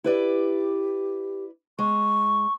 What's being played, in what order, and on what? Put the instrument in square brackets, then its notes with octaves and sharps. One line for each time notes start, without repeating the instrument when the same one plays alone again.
[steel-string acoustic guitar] E4 B4 D5 [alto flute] G4
[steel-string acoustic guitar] G#3 [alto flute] C#6